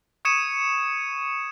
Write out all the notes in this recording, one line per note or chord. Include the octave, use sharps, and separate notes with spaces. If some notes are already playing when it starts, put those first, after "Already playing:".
C#6 D#6 G#6 C#7 D#7 E7